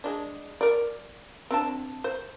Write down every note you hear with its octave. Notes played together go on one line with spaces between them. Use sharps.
G#3 D4
A#4 D5
C4 D4 A5
C5